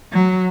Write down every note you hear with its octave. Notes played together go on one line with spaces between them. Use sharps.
F#3